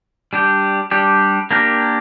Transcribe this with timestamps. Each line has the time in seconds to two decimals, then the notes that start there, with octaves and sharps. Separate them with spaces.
0.33 G3 D4 G4
0.91 G3 D4 G4
1.51 A#3 D4 G4 A#4